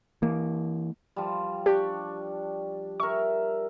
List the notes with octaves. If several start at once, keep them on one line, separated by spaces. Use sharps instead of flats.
E3 A#3
F3 G3
D4 G4 C#6
A#4 E5 C#6